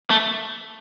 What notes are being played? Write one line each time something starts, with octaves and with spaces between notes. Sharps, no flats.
A3